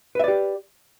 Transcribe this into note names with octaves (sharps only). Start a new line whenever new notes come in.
G4 B4 D5 E5